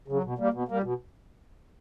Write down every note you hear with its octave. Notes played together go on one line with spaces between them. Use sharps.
C#3 F#3
B2
G3 A#3
B2
G3 A#3
B2